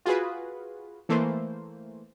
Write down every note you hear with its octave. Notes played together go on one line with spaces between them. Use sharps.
F4 F#4 G#4 B4
E3 A3 A#3 C5